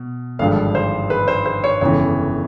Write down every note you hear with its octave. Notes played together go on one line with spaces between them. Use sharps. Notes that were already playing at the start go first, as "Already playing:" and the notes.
Already playing: B2
G#1 G2 D3 F3 G#3 F5
C5
B4
C5
C5
C#5
G1 F2 C#3 E3 C#5